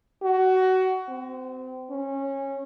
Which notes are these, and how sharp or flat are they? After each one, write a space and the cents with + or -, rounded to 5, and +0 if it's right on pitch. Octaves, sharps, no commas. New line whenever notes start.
F#4 +20
C4 -25
C#4 -20